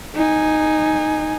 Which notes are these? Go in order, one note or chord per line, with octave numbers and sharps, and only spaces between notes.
D#4 G#5